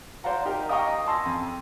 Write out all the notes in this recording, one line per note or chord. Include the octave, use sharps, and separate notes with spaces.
C5 D5 F5 F#5 A#5
D#4 G4 A#4
D#5 F5 G5 A#5 C#6 D#6
G#5 A5 C6 E6 A#6
F2